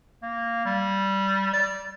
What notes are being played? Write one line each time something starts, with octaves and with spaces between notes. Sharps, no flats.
A#3
G3
D5